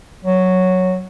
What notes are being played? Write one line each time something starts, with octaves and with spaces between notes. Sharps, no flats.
F#3